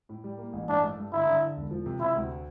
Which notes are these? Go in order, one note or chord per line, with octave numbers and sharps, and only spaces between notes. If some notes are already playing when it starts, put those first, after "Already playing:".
A2
G3
A#3
A1
G2 D4
A3
G2
D3 E4
D3
D3
E1
F3
C3
C3 E4
D2